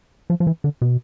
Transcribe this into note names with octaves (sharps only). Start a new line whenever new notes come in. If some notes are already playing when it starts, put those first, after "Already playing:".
F3
F3
E3
D3
B2